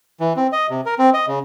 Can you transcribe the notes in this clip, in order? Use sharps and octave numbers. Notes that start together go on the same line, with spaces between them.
E3
C4
D#5
C3
A#4
C4
D#5
C#3